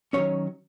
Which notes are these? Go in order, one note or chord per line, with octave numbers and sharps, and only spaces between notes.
D#3 F#3 C#4 C#5